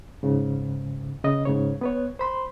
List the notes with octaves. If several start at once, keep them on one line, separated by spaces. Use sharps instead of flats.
G#2 C#3
C#3 D#5
G#2 C#3 C#5
B3 B4 C#5
C5 B5 C6